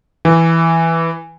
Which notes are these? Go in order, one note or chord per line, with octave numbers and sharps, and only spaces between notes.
E3